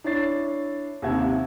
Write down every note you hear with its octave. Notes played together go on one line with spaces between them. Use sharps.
D4 E4 C#5 A6 C7
D#2 C3 E5 F#5 G#6